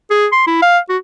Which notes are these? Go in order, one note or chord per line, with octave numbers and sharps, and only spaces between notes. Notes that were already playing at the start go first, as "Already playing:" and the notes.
G#4
C6
E4
F5
F#4